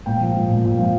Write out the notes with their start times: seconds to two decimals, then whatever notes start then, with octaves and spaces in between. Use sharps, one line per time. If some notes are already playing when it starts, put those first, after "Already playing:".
0.06 A#2 G5
0.20 F3
0.36 F3
0.50 A#2
0.64 A#2
0.78 F3